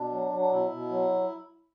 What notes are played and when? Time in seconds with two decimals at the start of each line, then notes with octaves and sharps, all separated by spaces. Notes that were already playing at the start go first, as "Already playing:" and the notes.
Already playing: B2 D4
0.11 F#3
0.31 F#3
0.39 D4
0.50 B2 E4
0.70 B2
0.90 F#3